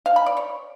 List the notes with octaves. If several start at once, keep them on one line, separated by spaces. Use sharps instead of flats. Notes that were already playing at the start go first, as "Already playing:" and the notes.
F5
B5
D5
C#5